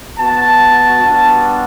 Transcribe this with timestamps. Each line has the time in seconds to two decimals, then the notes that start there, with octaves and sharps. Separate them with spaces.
0.18 B3 F#4 A5
1.01 G3 B3 D4 F#4